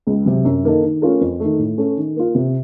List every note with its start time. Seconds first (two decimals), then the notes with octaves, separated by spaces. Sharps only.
0.07 C#2
0.26 C3 F#3
0.45 F#2
0.64 D#3 A#3 D#4 A4
0.83 D#3
1.02 A3 C#4 F4 A#4
1.21 F2
1.40 D#3 A3
1.59 A2
1.78 A3 C#4 A4
1.97 D#3
2.16 A#3 F4
2.35 C3